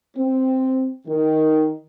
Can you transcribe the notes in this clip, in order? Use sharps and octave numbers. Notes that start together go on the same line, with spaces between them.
C4
D#3